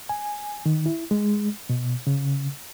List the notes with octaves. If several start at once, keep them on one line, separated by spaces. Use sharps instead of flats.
G#5
D#3
E4
G#3
B2
C#3